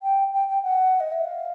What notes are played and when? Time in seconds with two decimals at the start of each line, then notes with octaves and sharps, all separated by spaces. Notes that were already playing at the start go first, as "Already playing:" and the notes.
0.02 G5
0.33 G5
0.48 G5
0.62 F#5
1.00 D#5
1.12 E5
1.24 F5